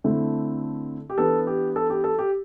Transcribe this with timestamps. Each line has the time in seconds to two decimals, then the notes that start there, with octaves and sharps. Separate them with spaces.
0.04 D3 A3 C4 E4
1.10 G4
1.18 E3 B3 D4 A4
1.47 G4
1.76 A4
1.90 G4
2.04 A4
2.18 G4